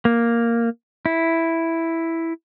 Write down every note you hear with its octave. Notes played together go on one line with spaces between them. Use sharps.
A#3
E4